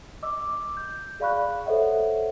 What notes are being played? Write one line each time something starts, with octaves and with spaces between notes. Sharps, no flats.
D#5 D6 E6
G6
G#4 D5 F5 B5 C#6 F#6
A4 C5 C#5 D#5 E5 F#5